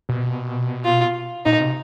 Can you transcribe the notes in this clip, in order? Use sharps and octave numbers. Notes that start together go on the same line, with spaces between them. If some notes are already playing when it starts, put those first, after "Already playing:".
B2
F4
A#2 D#4
C3